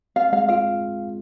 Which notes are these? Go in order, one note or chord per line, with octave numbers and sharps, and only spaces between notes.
C4 F5
G#3 F5
F4 F5